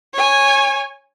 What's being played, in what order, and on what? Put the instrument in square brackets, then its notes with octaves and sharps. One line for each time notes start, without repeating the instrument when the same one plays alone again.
[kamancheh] C#5 G#5